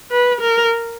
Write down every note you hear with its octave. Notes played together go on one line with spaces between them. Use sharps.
B4
A#4